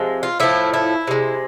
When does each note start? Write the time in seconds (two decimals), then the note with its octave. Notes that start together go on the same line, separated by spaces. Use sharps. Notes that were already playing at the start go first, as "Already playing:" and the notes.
Already playing: C3 F3 G#3
0.23 F4
0.40 A2 F3 A3 E4
0.74 E4
1.07 C3 G#3